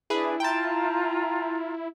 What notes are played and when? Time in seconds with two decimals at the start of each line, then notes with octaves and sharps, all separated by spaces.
0.10 D4 E4 G#4 B4
0.40 F4 G5 A5 A#5